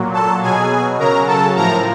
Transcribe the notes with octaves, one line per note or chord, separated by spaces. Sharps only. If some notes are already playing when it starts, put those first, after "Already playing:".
Already playing: A#2 F#3
A4 A5
B2 F#3 G#4 G#5
C#3 F#3 A#4 A#5
A4 A5
A2 F3 A#4 A#5